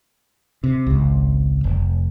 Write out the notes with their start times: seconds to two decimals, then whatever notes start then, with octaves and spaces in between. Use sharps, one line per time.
0.64 C3
0.87 G#1 C#2
1.64 F1